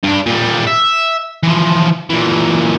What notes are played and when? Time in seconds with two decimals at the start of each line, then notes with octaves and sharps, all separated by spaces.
0.03 G2 D4
0.26 A#2 G3
0.67 E5
1.43 E3 F3
2.10 A#2 E3